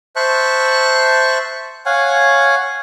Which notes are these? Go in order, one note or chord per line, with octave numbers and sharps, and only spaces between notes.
C5 E5 A5 C#6 F#6
C#5 F5 F#5 G#5